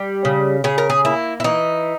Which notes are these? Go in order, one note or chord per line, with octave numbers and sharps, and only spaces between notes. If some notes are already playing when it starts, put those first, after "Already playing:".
Already playing: G3
C#3
C#3 G#4
A#4
G#4
A#3 E4
E4
E3 D#4